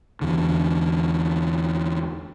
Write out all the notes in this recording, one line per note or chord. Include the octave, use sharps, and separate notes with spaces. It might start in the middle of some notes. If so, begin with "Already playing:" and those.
E2 D3